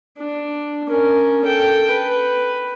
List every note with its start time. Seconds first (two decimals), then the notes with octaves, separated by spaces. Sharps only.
0.19 D4
0.89 C#4 A#4
1.45 A4 G5
1.91 B4